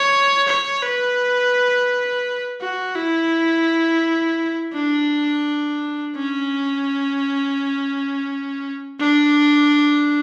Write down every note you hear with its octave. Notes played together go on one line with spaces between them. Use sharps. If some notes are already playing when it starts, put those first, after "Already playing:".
Already playing: C#5
C#5
B4
F#4
E4
D4
C#4
D4